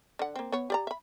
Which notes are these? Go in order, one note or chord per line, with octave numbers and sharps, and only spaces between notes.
D3 F#5
A#3 C4
B3 C#5
G4 D5 A#5
E5 B5